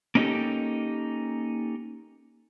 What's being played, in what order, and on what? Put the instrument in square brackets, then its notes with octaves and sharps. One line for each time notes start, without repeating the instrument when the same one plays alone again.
[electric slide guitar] A#3 C#4 D#4 F4 G4 A4